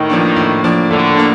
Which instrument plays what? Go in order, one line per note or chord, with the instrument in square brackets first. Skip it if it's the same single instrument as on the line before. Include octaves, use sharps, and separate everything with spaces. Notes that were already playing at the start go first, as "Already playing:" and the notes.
Already playing: [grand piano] A2 [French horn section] D#3
[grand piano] F3 A#3 D4
A2
F3 A#3 D4
[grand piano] A2 [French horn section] D3
[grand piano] A#3 D4